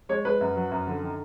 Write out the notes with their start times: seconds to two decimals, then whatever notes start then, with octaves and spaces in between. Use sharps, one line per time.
0.09 G#3 C#5
0.25 G#3 B4
0.41 F#2
0.56 F#3
0.72 F#2
0.87 D3
1.03 D#3